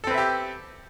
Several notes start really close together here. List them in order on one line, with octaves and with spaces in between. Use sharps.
A4 C4 B4 E5 G4